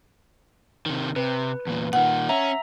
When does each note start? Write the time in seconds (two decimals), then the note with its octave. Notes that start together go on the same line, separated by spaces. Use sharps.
0.86 C3 D#3
1.16 C3 B4
1.67 E2 A#2
1.93 A#2 D#3 F#5
2.29 C#4 E5 A#5